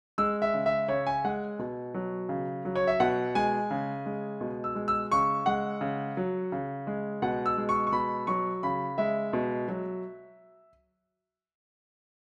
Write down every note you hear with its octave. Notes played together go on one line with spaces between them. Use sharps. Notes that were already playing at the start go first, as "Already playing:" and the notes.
G#3 E6
E5
C#3
E5
C#3 C#5
G#5
G#3 F#5
B2
F#3
C#3
F#3
C#5
E5
B2 F#5
G#3 G#5
C#3
G#3
B2
E6
G#3
E6
C#3 C#6
G#3 F#5
C#3
F#3
C#3
G#3
B2 F#5
E6
G#3
C#6
C#6
B2 B5
F#3 C#6
C#3 B5
G#3 E5
B2
F#3